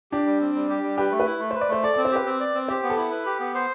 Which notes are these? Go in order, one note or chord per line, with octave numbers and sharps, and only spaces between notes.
D4 G4
G3
C4
G3
G4
G3
G4 B4
A3
B4
E4
A3
B4 C5
D5
A3 C5
A4 D5
C4 A4
C5
G4 B4
C4
D5
C4
G4 C5
B3
A4
E4
B4
G4
B3
C5